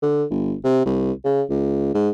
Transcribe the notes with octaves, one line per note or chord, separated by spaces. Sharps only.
D3
G1
C3
C2
C#3
C#2
G#2